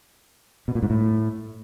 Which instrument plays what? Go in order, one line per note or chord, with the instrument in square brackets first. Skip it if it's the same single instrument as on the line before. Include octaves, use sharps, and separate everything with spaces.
[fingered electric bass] B2
A#2
G#2
A2